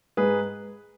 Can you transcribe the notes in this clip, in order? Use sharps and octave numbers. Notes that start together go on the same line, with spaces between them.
G#2 G#4 B4